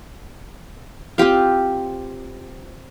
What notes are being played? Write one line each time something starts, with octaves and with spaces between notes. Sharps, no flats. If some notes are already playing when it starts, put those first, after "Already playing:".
C4 F4 G4 F5